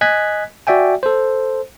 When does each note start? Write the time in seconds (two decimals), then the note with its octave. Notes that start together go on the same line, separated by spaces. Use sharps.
0.01 D#5 G#5 F#6 G#6 B6
0.67 F#4 D5 E5 G5 G#5
1.03 A4 C5